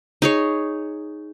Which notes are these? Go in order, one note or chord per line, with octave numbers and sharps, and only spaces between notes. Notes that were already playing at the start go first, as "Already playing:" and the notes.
D#4 G#4 C#5